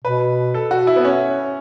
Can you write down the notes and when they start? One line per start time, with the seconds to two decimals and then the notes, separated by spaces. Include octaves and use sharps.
0.04 B2 B4
0.54 A4
0.71 F#4
0.87 E4
0.96 B3
1.05 C#4